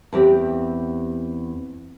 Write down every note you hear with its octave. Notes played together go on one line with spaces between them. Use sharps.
E2 C4 G4